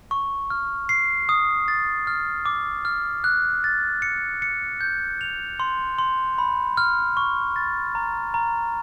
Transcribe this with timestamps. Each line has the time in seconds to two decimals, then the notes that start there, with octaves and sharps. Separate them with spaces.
0.11 C#6
0.50 F6
0.89 C7
1.29 D#6
1.68 A6
2.07 F6
2.46 D6
2.85 F6
3.24 F#6
3.64 A6
4.02 C#7
4.42 C#7
4.81 G6
5.21 F7
5.60 C6
5.99 C6
6.38 B5
6.77 F6
7.17 C#6
7.56 A6
7.95 A#5
8.34 A#5